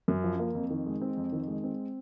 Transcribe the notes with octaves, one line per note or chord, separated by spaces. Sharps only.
F#2
F3
A#3
F2
D#3
G#3
C4
F2
D#3
G#3
C4